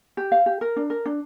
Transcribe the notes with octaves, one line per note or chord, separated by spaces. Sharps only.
G4
F5
G4
A#4
D4
A#4
D4